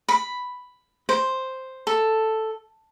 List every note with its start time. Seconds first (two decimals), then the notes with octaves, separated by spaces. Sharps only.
0.08 B5
1.09 C5
1.87 A4